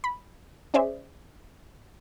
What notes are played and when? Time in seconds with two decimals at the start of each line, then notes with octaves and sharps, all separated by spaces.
0.04 B5
0.74 C#4 G#4 C5 D5 E5